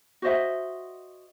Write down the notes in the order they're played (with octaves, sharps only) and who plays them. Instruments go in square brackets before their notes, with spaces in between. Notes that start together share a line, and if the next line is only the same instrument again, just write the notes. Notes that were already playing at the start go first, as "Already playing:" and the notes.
[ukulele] F#4 C5 D#5 E5